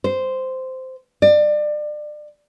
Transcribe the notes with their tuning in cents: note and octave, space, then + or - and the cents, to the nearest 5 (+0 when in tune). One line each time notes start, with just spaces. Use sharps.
C5 -10
D5 +30